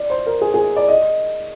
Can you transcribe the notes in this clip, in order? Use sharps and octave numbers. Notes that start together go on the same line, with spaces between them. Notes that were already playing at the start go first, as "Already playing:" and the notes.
Already playing: D5
C5
A#4
G#4
G#4
D5
D#5